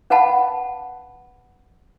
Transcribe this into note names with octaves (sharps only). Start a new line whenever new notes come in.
C#4 B4 F5 F#5 A5 B5